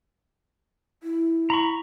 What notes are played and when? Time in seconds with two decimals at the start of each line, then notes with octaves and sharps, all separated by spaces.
1.03 E4
1.50 A#5 B5 C#6